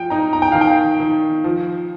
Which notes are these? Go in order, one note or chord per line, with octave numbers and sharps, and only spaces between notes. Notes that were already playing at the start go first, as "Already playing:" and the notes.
Already playing: F3 G5
D#4 A#5
A#5
G5
D#3 F5
G5
D#3
F3